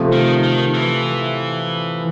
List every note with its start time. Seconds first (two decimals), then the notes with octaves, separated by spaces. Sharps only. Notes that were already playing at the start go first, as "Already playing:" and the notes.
Already playing: C3 F3 A3
0.12 D#3
0.43 D#3
0.74 E3